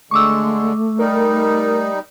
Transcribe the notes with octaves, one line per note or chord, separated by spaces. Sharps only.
D3 G#3 A3 C#6 D6 E6
G3 D#4 A#4